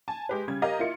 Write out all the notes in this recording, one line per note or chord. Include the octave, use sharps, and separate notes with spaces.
G#5 A5
G#3 G4 B4
C#3 G3 G#6
G4 A#4 D#5 F5 A#5
A#3 E4 F4 C#7